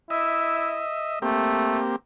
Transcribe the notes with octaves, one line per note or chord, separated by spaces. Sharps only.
E4 D#5 E5
A3 A#3 C4 G4